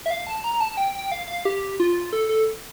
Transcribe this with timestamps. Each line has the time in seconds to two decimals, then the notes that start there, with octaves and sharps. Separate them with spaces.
0.06 E5
0.10 F5
0.27 A5
0.44 A#5
0.60 A5
0.77 G5
0.95 G5
1.12 F5
1.28 F5
1.45 G4
1.80 F4
2.13 A4
2.29 A4